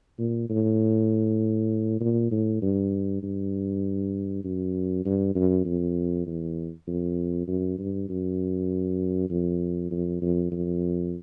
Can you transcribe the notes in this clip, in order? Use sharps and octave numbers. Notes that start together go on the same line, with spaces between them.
A#2
A2
A#2
A2
G2
G2
F#2
G2
F#2
F2
E2
F2
F#2
G2
F#2
F2
F2
F2
F2